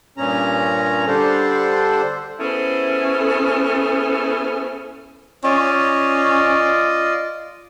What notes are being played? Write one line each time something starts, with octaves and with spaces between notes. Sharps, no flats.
G2 A#2 C#4 A#5
D3 G3 D4 A4 C5
B3 C#4 E4 G#4 A4 C5
C#4 F4 D5 D#5